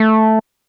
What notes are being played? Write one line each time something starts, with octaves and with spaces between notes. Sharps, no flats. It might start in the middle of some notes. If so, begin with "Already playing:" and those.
Already playing: A3